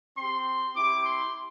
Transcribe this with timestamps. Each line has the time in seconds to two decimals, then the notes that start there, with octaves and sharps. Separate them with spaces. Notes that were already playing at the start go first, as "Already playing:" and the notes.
0.16 C4 G4 C6
0.75 C4 E4 G4 D6
1.05 C6